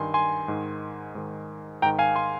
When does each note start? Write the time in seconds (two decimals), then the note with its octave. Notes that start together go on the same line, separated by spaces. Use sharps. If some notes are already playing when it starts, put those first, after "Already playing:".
Already playing: G2 D#3 G#5 C6
0.14 G#5 C6
0.48 G#2 D#3
1.15 G#2 D#3
1.82 G#2 D#3 G5 A#5
1.99 F5 G#5
2.16 G#5 C6